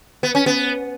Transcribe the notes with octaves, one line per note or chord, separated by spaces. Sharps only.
B3
C#4
B3